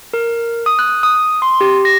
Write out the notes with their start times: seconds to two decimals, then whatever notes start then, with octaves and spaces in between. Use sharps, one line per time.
0.14 A#4
0.66 D#6
0.79 F#6
1.03 D#6
1.42 C6
1.61 G4
1.85 A#6